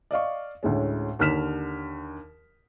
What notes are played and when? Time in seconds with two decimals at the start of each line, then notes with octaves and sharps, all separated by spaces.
0.11 D5 D#5 F5 C#6
0.63 D2 A2 G#3 C#4
1.19 D#2 D3 A#5 F6 B6 E7